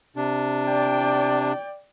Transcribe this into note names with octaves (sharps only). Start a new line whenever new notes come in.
C3 D4
D5 G5